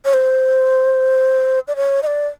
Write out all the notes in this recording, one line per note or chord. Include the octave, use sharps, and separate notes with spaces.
C#5
C5
D5
C#5
D#5
D5